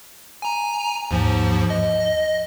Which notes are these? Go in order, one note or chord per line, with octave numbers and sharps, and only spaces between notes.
G#5 A#5
D#2 G#2 F3
D#5